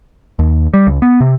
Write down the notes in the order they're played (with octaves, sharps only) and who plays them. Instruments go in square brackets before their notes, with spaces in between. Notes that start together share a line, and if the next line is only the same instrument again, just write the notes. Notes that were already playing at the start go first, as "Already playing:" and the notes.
[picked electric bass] D#2
G3
C#2
B3
C3